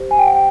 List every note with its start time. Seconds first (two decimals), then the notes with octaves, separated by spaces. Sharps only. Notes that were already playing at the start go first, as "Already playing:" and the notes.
Already playing: G4 C5
0.11 G#5
0.19 G5
0.26 F#5
0.35 G5